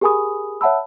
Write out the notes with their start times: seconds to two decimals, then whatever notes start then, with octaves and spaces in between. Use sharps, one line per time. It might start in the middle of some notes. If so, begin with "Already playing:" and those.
0.01 G4 G#4 A#4 G#5 B5 D#6
0.61 C#5 E5 F#5 A5 B5 E6